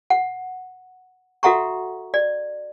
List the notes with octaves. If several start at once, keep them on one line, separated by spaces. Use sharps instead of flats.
F#5
F#4 A4 E5 F#5 A#5 C#6
D5